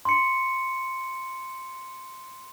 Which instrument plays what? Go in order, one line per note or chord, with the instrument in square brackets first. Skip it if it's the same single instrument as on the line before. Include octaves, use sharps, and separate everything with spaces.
[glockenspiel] C6 C#7